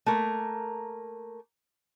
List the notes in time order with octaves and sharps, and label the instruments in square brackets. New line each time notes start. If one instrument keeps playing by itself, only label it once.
[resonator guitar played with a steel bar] A3 A#3 A#4